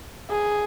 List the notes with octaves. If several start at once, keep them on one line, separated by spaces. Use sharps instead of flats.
G#4